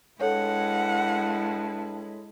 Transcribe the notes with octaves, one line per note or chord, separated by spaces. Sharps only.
G2 G#3 E4 A4 C#5 F#5